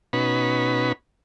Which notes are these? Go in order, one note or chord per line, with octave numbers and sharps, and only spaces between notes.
B2 C#4 D#4 F#4 B4 B5